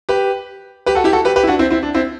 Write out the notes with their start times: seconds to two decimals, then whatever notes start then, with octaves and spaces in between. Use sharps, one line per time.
0.09 G4 B4
0.86 G4 B4
0.95 F#4 A4
1.04 E4 G4
1.13 F#4 A4
1.25 G4 B4
1.36 G4 B4
1.44 E4
1.47 D4 F#4
1.59 C4 E4
1.71 C4 E4
1.83 D4
1.94 C4 E4